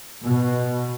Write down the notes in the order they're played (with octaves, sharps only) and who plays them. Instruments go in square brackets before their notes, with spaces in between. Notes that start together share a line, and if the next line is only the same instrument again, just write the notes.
[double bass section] B2